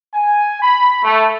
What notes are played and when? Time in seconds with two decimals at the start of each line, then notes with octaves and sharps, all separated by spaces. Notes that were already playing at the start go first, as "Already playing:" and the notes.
0.14 G#5
0.62 B5
1.03 A3